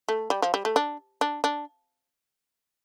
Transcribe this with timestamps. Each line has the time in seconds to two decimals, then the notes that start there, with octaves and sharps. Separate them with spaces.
0.09 A3
0.30 G3
0.42 F3
0.54 G3
0.65 A3
0.76 D4
1.21 D4
1.44 D4